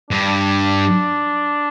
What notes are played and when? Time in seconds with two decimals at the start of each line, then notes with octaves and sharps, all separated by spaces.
0.11 G2 D4